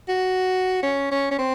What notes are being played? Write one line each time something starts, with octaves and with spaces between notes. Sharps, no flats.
F#4
C#4
C#4
C#4
C4